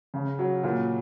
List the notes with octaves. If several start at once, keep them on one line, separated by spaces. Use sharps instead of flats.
C#3
F#3
A#2